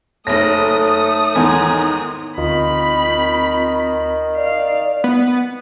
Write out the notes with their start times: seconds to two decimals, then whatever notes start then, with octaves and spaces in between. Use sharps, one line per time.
0.27 F#1 A3 D#4 A4 C#5 D#6 A#6
1.35 E2 G#2 D#3 G#5
2.38 D2 D#3 C4 F4 B5
4.37 D5 F5
5.04 B3